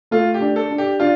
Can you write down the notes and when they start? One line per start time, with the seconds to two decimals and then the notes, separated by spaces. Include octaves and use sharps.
0.11 A3 F4
0.34 G4
0.41 D4
0.56 A4
0.71 D4
0.78 G4
1.00 D4 F4